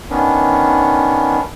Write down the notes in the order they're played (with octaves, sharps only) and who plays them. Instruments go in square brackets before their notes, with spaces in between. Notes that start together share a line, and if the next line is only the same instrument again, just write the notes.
[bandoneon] D#3 B3 C#4 D4